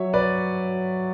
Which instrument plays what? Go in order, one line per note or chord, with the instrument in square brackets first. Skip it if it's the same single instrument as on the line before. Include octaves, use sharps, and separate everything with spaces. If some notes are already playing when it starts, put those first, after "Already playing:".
Already playing: [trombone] F#3 [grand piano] C#5 E5
[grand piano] B4 D5